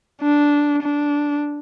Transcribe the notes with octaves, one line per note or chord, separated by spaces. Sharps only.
D4
D4